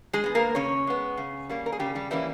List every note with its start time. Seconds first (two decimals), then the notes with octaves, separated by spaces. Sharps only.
0.13 G#3 G#4
0.24 G#3 B3
0.35 A#3 A#4
0.55 C#3 C#4 C#5
0.87 G#3 B3
1.17 C#3
1.49 G3 A#3 C#4
1.66 A#4
1.72 G#4
1.80 C#3 G3 G4
1.95 G3 G4
2.11 E3 G3 A#3 C#4 E4